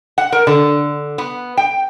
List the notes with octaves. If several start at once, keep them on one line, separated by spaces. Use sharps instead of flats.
F#5
A#4
D3
B3
G5